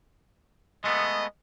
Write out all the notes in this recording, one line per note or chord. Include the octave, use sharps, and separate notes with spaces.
G#3 A3 B3 D#5